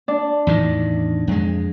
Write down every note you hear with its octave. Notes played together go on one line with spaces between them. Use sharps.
D4
E2 A2 D#3
F2 G#3